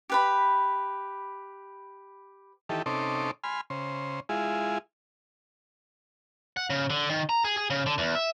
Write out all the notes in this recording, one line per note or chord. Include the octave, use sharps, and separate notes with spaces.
G4 B4 B5
D#3 E3 G4 A4
C3 C#4 D#4 A4 C6 D6
G#5 B5 C6 F6
C#3 C5
G#3 E4 F4 G#4
F#5
C#3
D3
D#3
A#5
G#4
G#4
C#3
D3
E2
E5